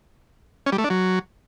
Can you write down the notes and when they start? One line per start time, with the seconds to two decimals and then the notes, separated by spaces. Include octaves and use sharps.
0.66 C#4
0.72 G3
0.78 A3
0.84 D4
0.90 F#3